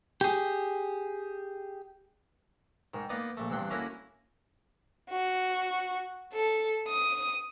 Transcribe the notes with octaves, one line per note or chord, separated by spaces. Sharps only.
G4 G#4
G#2 D#3
A#3 B3 D#4 D5
A#1 A3
E2 G2 C4 F#5 G5
D3 A#3 C#4 E4 F#4 A#4
F#4
A4
D#6